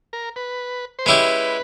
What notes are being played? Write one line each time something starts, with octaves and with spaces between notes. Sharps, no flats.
A#4
B4
C5
G#3 C#4 E4 G4 B4